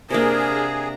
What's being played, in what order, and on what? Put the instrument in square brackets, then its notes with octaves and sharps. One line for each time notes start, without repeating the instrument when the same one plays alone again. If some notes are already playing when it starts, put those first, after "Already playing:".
[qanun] C3 A#3 [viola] D4 A#5 [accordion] G#4 [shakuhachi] A#4